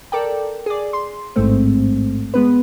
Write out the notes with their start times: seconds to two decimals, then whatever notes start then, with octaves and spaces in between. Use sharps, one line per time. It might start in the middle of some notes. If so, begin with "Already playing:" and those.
0.12 A4 A#4 D5 G5
0.66 G#4 D5
0.93 C6
1.36 A1 G#2 G#3 A3 C4
2.34 G#3 B3 B4